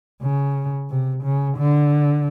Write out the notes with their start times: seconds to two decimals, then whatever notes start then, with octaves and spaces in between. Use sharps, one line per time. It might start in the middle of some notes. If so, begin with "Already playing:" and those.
0.22 C#3
0.90 C3
1.24 C#3
1.58 D3